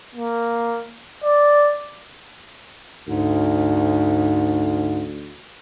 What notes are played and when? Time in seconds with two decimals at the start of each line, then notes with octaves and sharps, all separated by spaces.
0.16 A#3
1.24 D5
3.08 D2 G#2